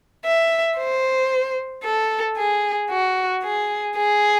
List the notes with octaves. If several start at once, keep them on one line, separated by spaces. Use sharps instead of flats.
E5
C5
A4
G#4
F#4
G#4
G#4